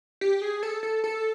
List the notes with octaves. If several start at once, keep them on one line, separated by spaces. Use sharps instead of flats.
G4
G#4
A4
A4
A4